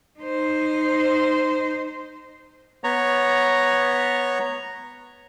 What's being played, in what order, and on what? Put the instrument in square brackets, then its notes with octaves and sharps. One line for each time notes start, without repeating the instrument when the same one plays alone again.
[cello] D#4 C5
[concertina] B3 C#5 A#5